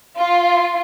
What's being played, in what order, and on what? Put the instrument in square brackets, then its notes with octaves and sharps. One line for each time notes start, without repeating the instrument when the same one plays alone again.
[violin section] F4